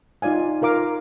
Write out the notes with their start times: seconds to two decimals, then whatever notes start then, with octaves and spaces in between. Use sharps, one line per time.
0.22 D#4 F4 D5 F5 G#5
0.62 F4 A#4 F5 D6